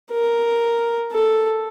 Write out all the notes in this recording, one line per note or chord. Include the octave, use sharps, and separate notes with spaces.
A#4
A4